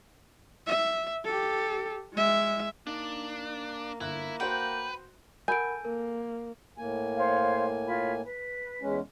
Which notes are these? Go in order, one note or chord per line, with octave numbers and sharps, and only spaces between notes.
E5
G4 A4
G#3 E5
A#3 D4 D#4
G1 A#3 E4 F5 F#6
F#4 B4 C5 F#5 G5
A4 A#4 F#5 G#5 B5 G6 D7
A#3 A#4
A2 A#3 G#5
C5 C#5 F5
F4 C#5 B5
B4
E2 G#3 C#4